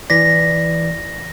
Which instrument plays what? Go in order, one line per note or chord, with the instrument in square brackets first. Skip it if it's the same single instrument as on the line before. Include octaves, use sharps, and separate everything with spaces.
[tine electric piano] E3 D5 [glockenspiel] A#6 B6